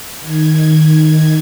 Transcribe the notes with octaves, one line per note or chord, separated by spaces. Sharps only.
D#3 G#6